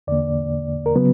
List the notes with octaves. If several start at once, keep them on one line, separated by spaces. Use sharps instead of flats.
E2 D3 A#3 D5
A#4
C#3 F#3 B3 B4